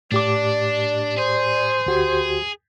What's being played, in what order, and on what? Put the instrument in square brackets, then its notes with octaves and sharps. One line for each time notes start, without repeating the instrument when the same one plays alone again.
[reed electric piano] A2 G4 D6 [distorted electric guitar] D4 [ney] D5
[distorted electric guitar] G#4 [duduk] C5
[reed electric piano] D2 F#4 G4